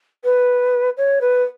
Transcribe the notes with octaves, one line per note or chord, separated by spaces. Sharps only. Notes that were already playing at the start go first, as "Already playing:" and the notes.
B4
C#5
B4